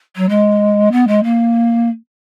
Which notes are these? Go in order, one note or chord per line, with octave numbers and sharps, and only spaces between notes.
F#3
G#3
B3
G#3
A#3